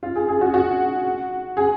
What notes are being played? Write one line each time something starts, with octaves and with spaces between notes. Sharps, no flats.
F4
G#4
G#4
F#4
F#4
G#4